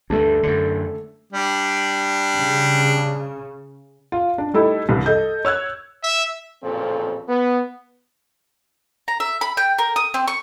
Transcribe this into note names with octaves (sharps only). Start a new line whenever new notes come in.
D2 G2 A3 D4
F#2 D3
G3 D4
C#3
F4
D4
G3 A3 D#4 E4
C2 G2
A4 D#5 G6
C#5 E6 F#6 G#6
E5
A1 F2 A#2 C#3 C4 A4
B3
A#5
E5
B5
G5
A#4
D#6
C4
C#6